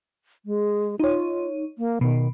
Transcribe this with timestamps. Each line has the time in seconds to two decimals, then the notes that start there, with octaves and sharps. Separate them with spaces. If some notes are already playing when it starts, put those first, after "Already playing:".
0.46 G#3
1.00 D#4 F4 C#5
1.78 A#3
2.01 B2 D#3